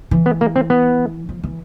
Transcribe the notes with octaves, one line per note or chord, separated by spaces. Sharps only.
E3
B3
A#3
C4
B3
F3
E3